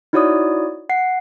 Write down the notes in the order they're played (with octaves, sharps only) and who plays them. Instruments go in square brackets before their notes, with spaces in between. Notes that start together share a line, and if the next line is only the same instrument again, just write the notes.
[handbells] D#4 E4 F#4 C#5 D5 D#6
F#5 C7